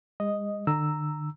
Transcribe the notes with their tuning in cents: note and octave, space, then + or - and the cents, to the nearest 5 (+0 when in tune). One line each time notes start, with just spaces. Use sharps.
G#3 -40 D#5 +0
D3 +40 A#5 -5 E6 +0